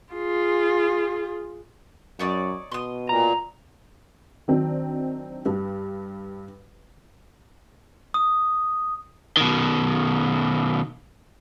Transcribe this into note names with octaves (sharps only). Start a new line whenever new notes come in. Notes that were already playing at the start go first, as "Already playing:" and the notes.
F4 G#4
F#2 D#4 C#5 D5
B2 C6 D#6
A#2 A#5
D#3 F#3 C4 D4
G2
D#6
B2 D#3